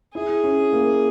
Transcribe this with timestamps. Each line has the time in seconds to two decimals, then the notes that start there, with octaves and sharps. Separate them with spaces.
0.14 E4 G#4
0.44 C#4
0.73 A#3